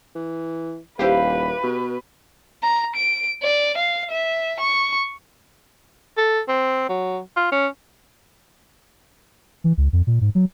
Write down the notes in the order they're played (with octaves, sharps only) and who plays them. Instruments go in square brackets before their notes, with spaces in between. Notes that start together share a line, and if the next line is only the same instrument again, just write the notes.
[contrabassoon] E3
[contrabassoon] D#1 [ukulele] E4 C5 F5 [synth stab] G4 [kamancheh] B4
[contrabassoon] B2
[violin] A#5
D7
D5
F5
E5
C#6
[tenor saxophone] A4
C4
F#3
F4
C#4
[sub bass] E3
C#2
F2
A#2
G#2
F#3